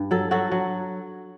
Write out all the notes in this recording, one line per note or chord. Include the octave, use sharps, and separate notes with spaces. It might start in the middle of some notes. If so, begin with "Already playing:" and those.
Already playing: G2
F#3 A4
F#3 F#4 A4
F#3